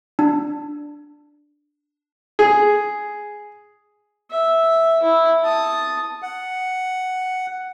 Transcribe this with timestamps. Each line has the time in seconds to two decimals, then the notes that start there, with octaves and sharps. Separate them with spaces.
0.19 D4
2.39 G#4
4.31 E5
5.02 E4
5.44 A5 D#6
6.22 F#5